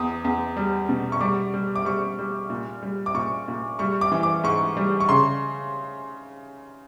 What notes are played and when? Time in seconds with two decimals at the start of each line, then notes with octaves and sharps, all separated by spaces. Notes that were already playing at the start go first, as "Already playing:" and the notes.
Already playing: E2 D#6
0.25 E2
0.57 G3
0.89 B2
1.12 C#6
1.21 G3 D6
1.54 G3
1.76 D6
1.85 G3 C#6
2.19 G3
2.50 A#2
2.83 G3
3.06 D6
3.14 A#2 C#6
3.48 A#2
3.79 G3 C#6
4.01 D6
4.11 E3
4.23 D6
4.44 G#2 C#6
4.77 G3
5.01 C#6
5.09 C#3 C6